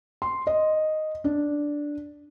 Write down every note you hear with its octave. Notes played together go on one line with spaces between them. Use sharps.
C6
D#5
D4